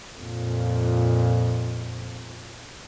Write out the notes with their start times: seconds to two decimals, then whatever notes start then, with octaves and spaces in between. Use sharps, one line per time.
0.18 F2 A#2